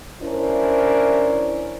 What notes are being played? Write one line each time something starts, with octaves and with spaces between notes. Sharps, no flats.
C#4 D4 E4 A#4 C5 D5